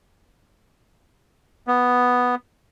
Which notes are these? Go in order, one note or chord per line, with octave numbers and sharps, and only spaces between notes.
B3